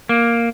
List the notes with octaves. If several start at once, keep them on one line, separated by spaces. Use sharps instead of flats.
A#3